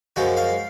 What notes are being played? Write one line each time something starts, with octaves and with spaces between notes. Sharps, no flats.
F#2 F3 G#3 F#4
F5